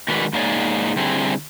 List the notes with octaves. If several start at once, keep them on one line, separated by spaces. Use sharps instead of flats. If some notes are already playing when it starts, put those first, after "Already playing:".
D#3 G#3 F#4 A#4 B4 D5
G#2 A#3 D#4 G#4 C#5 D5
D3 G3 C4 E4 G#4